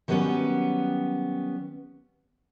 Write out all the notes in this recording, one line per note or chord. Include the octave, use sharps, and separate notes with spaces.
D#3 F#3 G3 A3 B3 C#4